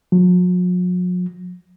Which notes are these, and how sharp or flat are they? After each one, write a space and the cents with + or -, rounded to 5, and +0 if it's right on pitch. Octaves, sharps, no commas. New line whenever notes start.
F#3 -45